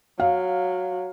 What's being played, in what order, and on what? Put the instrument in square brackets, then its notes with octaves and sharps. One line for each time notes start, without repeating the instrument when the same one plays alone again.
[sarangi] F#3 [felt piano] F5